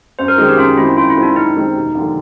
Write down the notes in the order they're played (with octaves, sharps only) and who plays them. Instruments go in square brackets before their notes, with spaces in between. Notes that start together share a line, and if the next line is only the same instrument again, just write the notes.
[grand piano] F#2 [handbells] C5
[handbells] A#4
[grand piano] D#3 G#3 C4 [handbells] G#4
[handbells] G4
[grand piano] F#2 [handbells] F4
[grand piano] D#3 G#3 C4 [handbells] E4
[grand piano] F#2 [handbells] F4
[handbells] E4
[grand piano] D#3 G#3 C4
[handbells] D4
[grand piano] F#2 [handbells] D#4
[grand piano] D#3 G#3 C4
E1
D#2 D3 F3